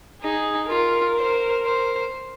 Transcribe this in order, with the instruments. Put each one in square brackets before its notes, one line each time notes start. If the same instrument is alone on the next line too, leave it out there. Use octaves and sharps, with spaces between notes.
[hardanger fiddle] D#4 [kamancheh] G#4
[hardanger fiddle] F4 [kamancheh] A#4
[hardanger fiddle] C5
C5